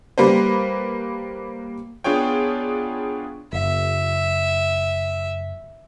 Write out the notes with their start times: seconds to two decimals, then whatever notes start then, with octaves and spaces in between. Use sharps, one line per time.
0.18 G3 A#3 B4 C5
2.04 B3 D4 F4 G#4 C#5 G5
3.53 F#1 E5